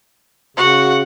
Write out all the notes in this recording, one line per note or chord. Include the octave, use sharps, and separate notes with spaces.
C#3 F#4 F#5